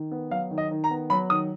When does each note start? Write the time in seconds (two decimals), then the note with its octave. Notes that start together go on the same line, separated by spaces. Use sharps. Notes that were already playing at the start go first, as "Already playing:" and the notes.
Already playing: D#3
0.11 B3
0.31 F#3 F5
0.51 D#3
0.58 D#5
0.71 D#3
0.84 A#5
0.90 B3
1.10 F#3 B5
1.30 D#3 D#6